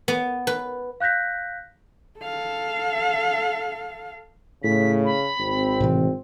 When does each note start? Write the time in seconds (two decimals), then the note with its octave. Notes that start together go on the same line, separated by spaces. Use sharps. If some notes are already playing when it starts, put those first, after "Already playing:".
0.08 B3
0.47 B4
1.00 F5 F#6 G6 A#6 B6
2.19 A4 F5
4.64 A2 C#3 B6
5.05 B5
5.39 G#1 C4
5.80 A2 C3 E3